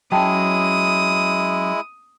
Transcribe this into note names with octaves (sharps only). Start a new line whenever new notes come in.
F#3 G#3 C#4 E4 G5 A5 D#6